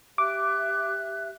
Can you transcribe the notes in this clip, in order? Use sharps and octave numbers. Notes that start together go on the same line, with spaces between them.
G4 E5 D6 F#6